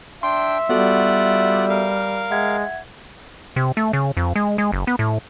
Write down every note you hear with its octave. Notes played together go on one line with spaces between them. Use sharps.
D4 E5 G5 C6
G3 B3 F4 F#4 A4 D5 F#5
A#4 F5
G#3 E5 F#5 G#6
C3
A3
C#3
F2
G#3
G#3
F#1
B3
A2